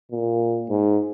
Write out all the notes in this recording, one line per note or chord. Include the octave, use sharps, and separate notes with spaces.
A#2
G#2